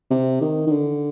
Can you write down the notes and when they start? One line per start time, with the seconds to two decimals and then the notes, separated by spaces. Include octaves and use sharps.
0.10 C3
0.41 D#3
0.67 D#3
0.72 D3